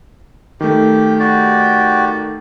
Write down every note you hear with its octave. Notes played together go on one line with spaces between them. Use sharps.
D#3 A3 G4
F#4 G4 D5